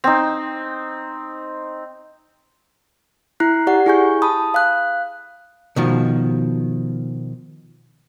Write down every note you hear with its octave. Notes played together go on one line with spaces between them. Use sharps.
C4 D#4
E4 A#5 F#6 C7
G4 D5 F#5
E4 G#4 G#5 C#6 G6
A5 B5 D#6
F5 F#6
B2 D#3 F3